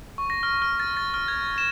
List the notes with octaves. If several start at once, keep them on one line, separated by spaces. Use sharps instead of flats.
C#6
A#6
F6
F6
A6
A6
F6
G#6
E7